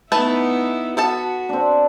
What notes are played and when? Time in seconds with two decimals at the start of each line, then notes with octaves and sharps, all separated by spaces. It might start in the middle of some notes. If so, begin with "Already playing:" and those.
0.12 A3 B3 D#4 E4 B4 A5
0.97 B3 F#4 A4 A5
1.49 C4 D4